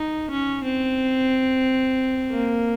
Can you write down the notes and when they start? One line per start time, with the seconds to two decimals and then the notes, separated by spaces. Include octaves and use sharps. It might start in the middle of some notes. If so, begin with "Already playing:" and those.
Already playing: D#4
0.31 C#4
0.64 C4
2.31 A#3